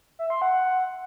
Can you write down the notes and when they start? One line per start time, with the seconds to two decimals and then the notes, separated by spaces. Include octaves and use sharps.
0.19 E5
0.30 C6
0.42 F#5